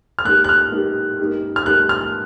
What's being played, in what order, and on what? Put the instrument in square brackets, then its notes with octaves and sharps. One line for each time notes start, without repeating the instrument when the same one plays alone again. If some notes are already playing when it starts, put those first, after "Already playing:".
[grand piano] F6
[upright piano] A#3 D#4 G4 [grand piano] F#6
[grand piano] F#6
F6
[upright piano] A#3 D#4 G4
A#3 D#4 G4
[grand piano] F6
[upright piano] A#3 D#4 G4 [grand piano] F#6
[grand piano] F6